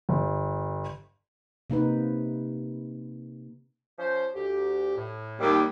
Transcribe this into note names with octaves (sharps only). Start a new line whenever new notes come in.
G1
C3 A#3 D#4 B4
F3 C#4 C5
D2 G4
A2
D#2 G3